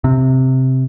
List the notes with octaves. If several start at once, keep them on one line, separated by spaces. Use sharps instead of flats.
C3